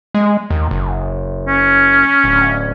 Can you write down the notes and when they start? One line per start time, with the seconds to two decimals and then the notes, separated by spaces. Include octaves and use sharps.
0.15 G#3
0.50 D#2
0.71 F#1
1.47 C#4
2.24 D1